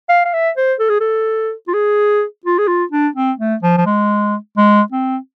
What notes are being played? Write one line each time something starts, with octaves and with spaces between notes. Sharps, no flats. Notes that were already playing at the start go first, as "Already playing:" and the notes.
F5
F5
E5
C5
A4
G#4
A4
F4
G#4
F4
G#4
F4
D4
C4
A3
F3
F3
G#3
G#3
C4